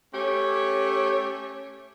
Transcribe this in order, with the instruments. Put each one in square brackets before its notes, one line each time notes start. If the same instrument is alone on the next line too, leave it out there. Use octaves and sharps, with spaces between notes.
[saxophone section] A3 C#4 G4 C#5